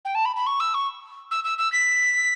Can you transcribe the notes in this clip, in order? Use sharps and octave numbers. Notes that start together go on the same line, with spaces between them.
G5
A5
B5
B5
C#6
E6
C#6
E6
E6
E6
B6